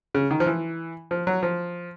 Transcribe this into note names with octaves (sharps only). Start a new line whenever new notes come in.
C#3
D#3
F3
E3
F3
F#3
F3